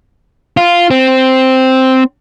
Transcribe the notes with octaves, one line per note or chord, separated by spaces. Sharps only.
F4
C4